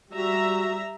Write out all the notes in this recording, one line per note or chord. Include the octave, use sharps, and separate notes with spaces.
G3 F#4 E5 A#5